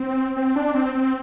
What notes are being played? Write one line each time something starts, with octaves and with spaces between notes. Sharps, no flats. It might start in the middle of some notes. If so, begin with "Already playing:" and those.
Already playing: C4
C4
D4
C4
C4